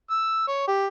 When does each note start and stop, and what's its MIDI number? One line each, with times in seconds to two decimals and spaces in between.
0.11 0.45 88
0.48 0.63 73
0.68 0.86 67